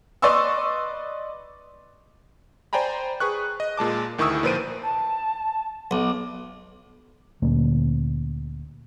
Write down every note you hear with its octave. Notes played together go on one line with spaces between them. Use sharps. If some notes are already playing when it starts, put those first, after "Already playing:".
B4 D5 D#5 C6 C#6 E6
C5 D5 G5 G#5 A#5 B5
G#4 B4 C#6 F#6
D#5
A#2 G#3 A5 D6
D2 D#3 E4 C#6 D#6 E6
A#2 F3 B4 C5 D7 D#7
A5
B1 D6
D2 A#2 A#3 C#4